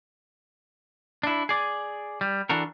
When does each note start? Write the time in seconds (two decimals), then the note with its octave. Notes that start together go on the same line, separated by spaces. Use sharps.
1.23 D4 E4
1.49 G#4 D5
2.21 G3
2.49 E3 D4 F#4 A4 A#4